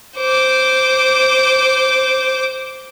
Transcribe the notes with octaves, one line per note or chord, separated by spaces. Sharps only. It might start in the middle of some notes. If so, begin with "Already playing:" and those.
C5 D6